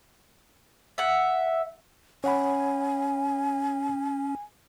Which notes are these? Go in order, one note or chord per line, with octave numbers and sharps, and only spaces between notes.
E5 F#5
C#4 C#5 F#5 G#5 B5